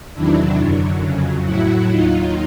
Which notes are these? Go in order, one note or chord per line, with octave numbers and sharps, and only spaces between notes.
E2 C3 D#3 F#3 D4 E4
F#2 D3 F#3
F2 C#3 F#3
A2 F#3 E4 F#4
D#2 D#3 F#3 D#4 F4